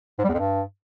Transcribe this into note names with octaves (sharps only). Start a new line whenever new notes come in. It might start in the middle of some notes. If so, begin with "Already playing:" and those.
G#2
G3
E2
F2
G2